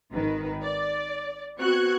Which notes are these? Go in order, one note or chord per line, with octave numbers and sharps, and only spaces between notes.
G#1 D#3 B4
D5
B3 C4 F#4 F#6 G#6 C#7